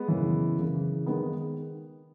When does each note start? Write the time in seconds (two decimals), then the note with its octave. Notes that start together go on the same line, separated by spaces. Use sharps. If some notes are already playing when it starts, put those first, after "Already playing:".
Already playing: G#3 B3
0.08 F#2 C#3 E3
0.57 F#2 C#3 E3
1.06 D#3 G#3 B3